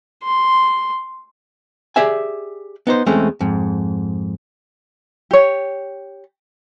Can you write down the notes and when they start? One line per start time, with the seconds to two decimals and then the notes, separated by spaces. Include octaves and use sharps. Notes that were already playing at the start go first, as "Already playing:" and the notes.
0.23 C6
1.96 G4 G#4 D5 E5 G#5
2.87 B3 D#4 C5
3.06 E2 G#3 A3 C4 C#4
3.41 F2 G#2
5.31 G4 C#5